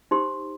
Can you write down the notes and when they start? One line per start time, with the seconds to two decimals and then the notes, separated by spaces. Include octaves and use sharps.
0.11 D#4 G4 C5 C6